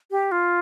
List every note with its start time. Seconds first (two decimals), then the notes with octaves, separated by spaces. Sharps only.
0.11 G4
0.32 F4